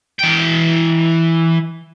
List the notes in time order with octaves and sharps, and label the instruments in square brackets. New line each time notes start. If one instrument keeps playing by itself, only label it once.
[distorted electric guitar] E3 G5